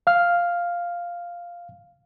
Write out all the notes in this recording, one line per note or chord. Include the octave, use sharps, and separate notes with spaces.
F5 F6